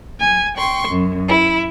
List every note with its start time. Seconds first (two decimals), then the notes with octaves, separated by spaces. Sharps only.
0.21 G#5
0.57 G5 C6 C#6
0.88 F#2
1.28 E4